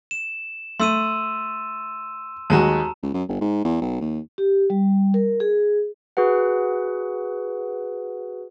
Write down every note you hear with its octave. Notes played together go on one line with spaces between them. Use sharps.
E7
A3 C6 E6 D#7
D#2 G#3 F#4 A5 A#5
C#2
F#2
G1
G#2
E2
B1
D#2
G4
G3
A#4
G#4
F#4 G#4 B4 F#5